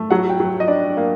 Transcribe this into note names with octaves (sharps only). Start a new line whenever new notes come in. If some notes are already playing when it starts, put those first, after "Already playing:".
Already playing: A3
F#3 F#5
G5
F#3
D#5
D4 D5
A#3